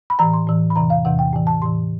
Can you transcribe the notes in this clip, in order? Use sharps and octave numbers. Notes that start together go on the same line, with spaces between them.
B5
A2 E3 A#5
C6
A2 E3
B5
E2 C3 E3 A#5
F5
E2 C3 E3 F#5
G5
A2 E3 G#5
A5
A2 E3 C6